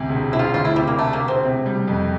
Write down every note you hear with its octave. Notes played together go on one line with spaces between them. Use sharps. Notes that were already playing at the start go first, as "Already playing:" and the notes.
Already playing: D2 C3
E1
E1 E4
F4
D2 F4
E4
C3 G3
A#3
E1 A3
A#3
E1
C4
C3
G3
F2